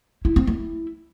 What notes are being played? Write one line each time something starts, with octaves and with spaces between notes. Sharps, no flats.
E4
C4
E4